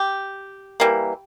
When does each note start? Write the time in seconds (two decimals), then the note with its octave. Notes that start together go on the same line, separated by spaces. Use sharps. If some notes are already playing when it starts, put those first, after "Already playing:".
Already playing: G4
0.80 E3 G3 A#3